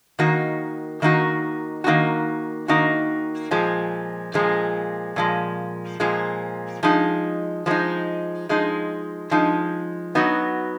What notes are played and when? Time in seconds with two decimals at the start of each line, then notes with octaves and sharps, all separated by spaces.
0.19 D#3 A#3 D#4 F#4
1.02 D#3 A#3 D#4 F#4
1.84 D#3 A#3 D#4 F#4
2.68 D#3 A#3 D#4 F#4
3.51 A#2 F3 G#3
4.34 A#2 F3 G#3
5.16 A#2 F3 G#3
6.00 A#2 F3 G#3
6.83 F3 G#3 D#4
7.66 F3 G#3 D#4
8.49 F3 G#3 D#4
9.31 F3 G#3 D#4
10.15 F#3 B3 D#4 F#4